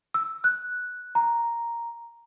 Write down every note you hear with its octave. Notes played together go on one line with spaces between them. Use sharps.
E6
F#6
A#5